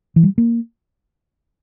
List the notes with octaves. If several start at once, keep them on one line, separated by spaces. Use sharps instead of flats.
E3
G3
A#3